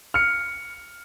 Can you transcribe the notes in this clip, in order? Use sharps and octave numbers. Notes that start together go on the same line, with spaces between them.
F6 C#7